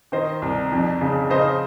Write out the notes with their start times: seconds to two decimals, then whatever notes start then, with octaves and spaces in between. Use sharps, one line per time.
0.12 D#3 C5 D#5
0.42 C2
0.72 F2
1.01 C#3
1.30 C#3 C5 D#5